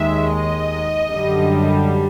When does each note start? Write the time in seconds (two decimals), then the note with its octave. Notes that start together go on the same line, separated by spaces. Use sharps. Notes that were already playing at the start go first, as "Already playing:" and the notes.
Already playing: D#2 D#3 G#3 E5
0.33 D#5
1.10 F#2 D3 G3